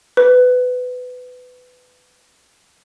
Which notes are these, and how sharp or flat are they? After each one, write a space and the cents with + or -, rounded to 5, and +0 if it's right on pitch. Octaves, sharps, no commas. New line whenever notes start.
B4 +20